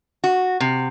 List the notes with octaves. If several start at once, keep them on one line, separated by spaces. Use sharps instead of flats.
F#4
C3